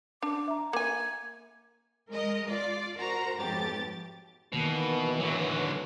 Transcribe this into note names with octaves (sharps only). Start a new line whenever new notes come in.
D4 D6
E5 A#5
A#3 G#5 G#6
G#3 A#4 D#5
F4 D5
F#4 A#4 C5 F#5 A#5
B1 F2 G#2 G4 A6
B2 D#3 E3 A#3
D3 F#3